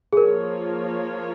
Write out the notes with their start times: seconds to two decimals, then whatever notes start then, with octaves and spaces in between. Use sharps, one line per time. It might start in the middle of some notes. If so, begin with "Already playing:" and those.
0.13 G#4
0.17 F3 A#3 F4 A#4 C#5